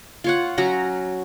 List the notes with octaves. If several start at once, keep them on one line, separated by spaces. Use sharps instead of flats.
F4 C#5 F#5
F#3 C#4 F#4 A#5